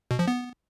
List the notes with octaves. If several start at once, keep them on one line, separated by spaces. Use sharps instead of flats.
B2
F3
B3